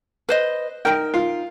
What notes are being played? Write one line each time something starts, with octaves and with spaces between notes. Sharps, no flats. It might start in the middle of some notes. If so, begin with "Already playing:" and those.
B4 C5 D#5
D#4 A#4 G5
F4